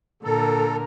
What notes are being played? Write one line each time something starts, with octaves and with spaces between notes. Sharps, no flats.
A#2 D3 A4 A#4